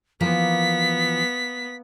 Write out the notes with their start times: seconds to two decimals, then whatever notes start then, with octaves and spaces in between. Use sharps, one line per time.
0.21 E3 F3 A#3 B3 B6